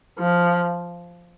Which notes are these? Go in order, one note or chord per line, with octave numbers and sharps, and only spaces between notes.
F3